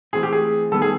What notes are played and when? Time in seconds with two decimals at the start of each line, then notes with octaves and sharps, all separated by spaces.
0.13 E3 A3 C4 G#4
0.23 G4
0.33 G#4
0.72 D#3 G3 B3 A4
0.82 G#4